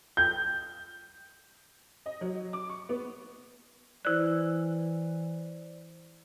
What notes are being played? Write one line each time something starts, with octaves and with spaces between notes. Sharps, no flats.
G6
D#5
F#3
D6
C#6
B3
E3 E4 C5 D5 F#6